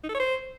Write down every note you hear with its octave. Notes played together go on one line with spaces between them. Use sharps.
D#4
A4
C#5
C5